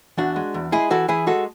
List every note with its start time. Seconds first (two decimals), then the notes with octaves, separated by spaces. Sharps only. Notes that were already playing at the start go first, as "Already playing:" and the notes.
0.18 E2 D4 F#4
0.36 G#3
0.54 E2
0.72 G#3 E4 G#4
0.90 E3 F#4 A4
1.08 E3 E4 G#4
1.27 G#3 F#4 A4